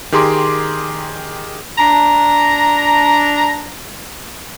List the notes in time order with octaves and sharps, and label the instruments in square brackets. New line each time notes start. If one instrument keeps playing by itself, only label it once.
[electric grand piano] D#3 G4 G#4 A#5 C6 D6
[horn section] D4 A#5